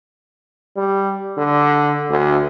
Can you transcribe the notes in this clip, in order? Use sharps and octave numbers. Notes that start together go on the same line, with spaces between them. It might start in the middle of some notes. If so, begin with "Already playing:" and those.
G3
D3
D2